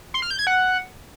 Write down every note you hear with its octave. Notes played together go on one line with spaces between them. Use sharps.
C6
F6
G6
G#6
F#5